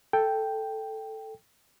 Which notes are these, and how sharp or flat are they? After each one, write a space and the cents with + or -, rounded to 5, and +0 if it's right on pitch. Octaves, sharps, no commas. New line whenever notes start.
A4 +0 G5 +0